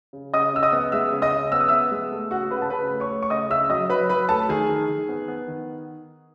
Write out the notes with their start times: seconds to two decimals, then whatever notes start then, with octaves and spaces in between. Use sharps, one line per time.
0.13 C#3
0.34 C#3 D#5 D#6
0.53 C#3 E6
0.63 D#5 D#6
0.72 B3
0.92 G#3 E5 E6
1.12 C#3
1.22 D#5 D#6
1.33 C#3
1.52 B3 E6
1.61 D#6
1.69 B3 E5 E6
1.91 G#3
2.12 A3
2.31 C#3 F#4 F#5
2.51 C#3 B4 B5
2.62 A5
2.70 C#3 B4 B5
2.90 A3
3.00 C#5 C#6
3.10 A3
3.23 C#6
3.30 C#3 D#5 D#6
3.50 C#3 E5 E6
3.69 F#3 D#5 D#6
3.89 F#3 B4 B5
4.09 F#3 B4 B5
4.29 A3 A4 A5
4.49 D#3 G#4 G#5
4.69 D#3
4.88 D#3
5.09 B3
5.28 B3
5.48 D#3